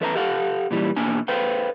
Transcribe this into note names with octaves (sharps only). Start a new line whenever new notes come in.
E2 A4 B4 E5 A5 A#5
G4 A4 F5 F#5
A#2 E3 G3
E2 B2 A#3 D4 G#5
A4 B4 C5 F5 G5